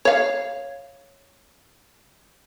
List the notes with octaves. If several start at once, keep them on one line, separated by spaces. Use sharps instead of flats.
C#5 F5